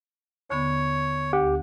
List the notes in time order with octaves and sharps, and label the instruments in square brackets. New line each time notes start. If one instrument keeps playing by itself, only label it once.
[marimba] D#2 D3 B3 [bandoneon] C#5
[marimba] D2 [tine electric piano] G4